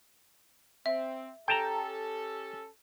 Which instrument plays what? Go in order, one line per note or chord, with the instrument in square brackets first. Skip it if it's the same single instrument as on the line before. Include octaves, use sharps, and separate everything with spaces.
[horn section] C4 [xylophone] E5
[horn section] C#4 G4 A4 [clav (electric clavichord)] G5 A5 A#5